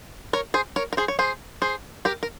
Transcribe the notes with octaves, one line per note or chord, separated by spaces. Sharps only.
A#4 C#5
G#4 C5
A#4 C#5
A#4
G#4 C5
C#5
G#4 C5
G#4 C5
G4 A#4
A#4